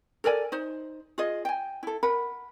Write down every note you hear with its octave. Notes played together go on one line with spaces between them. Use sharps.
A4 A#4 D5 G#5
D#4 C5
F4 G#4 D#5
G5 G#5
E4 A4
A#4 F#5 B5